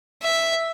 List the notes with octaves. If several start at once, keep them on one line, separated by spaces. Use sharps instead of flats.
E5